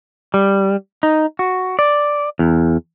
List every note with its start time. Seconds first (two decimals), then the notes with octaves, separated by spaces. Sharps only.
0.34 G3
1.03 D#4
1.39 F#4
1.79 D5
2.39 E2